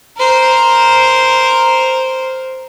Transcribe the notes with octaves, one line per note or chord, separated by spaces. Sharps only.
A#4 C5